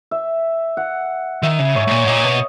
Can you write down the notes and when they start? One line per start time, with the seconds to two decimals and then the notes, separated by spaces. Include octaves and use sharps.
0.11 E5
0.77 F#5
1.43 D#3 E5
1.59 C#3
1.75 G#2 C#5
1.87 G#2
1.91 A#2
2.04 G#2
2.07 A#2 D#5
2.24 B2